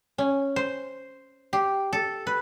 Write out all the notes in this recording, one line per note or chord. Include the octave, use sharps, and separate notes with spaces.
C#4
C5
G4
A4
B4